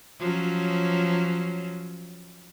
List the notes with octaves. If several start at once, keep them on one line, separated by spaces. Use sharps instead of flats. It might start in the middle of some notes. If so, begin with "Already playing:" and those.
F3 F#3 C#4